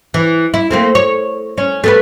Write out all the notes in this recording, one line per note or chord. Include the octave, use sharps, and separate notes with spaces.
E3
E4
A3 A#3 C4
C#5
C#4
A3 B3 B4